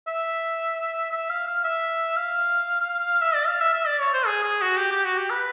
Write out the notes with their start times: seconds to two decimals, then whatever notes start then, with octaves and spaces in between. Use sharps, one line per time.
0.07 E5
1.12 E5
1.30 F5
1.47 F5
1.64 E5
2.17 F5
3.21 E5
3.35 D5
3.47 F5
3.61 E5
3.74 E5
3.87 D5
4.00 C#5
4.14 C5
4.26 G#4
4.43 G#4
4.61 F#4
4.78 G4
4.91 G4
5.05 F#4
5.18 G4
5.30 B4